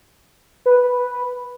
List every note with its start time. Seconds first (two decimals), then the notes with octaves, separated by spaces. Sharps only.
0.66 B4